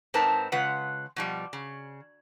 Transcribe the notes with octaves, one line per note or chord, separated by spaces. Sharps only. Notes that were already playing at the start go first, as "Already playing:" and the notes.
G#2 C4 D#4 A#4 B4 A5
C#3 G#3 F4 B4 F#5
B2 F3 G3
C#3